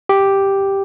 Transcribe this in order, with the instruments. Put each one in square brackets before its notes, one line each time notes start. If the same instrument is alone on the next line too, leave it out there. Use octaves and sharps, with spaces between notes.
[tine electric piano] G4